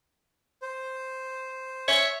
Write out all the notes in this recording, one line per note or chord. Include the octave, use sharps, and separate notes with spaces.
C5
C#5 E5